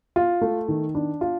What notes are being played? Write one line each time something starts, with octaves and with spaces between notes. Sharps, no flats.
F4
A3
D#3
D4
F4